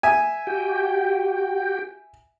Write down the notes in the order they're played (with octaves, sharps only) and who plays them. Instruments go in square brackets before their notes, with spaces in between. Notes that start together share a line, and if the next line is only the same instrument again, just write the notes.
[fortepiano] E5 G#5
[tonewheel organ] F#4 G4 G5